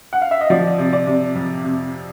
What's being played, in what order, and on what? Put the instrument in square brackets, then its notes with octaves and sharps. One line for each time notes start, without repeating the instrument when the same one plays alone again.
[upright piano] F#5
F5
E5
D#5
[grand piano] F3 [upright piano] D5
[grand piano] C3
[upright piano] D5
[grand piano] C3
F2
C3